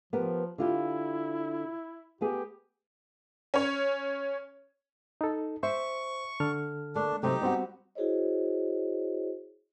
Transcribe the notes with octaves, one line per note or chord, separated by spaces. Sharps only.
F3 B3 G4 A#4
D3 E4 F4 G4
A3 B3 G4 G#4
C#4 C#5
D#4 A4
C5 E5 C#6
D3 A4 F6
A3 A#3 D4
C3 F#3 A3 C4 D#4 G4
G3 B3 C4 F#4
E4 F#4 G#4 C5 C#5 D#5